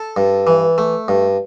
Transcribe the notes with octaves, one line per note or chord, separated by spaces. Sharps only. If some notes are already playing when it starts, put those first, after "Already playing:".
Already playing: A4 A5
G2
E3
A3
G2